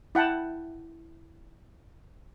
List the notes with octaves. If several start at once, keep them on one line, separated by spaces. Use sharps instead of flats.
E4 F#5 G5 A5